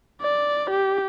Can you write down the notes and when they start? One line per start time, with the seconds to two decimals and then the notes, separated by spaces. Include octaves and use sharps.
0.22 D5
0.70 G4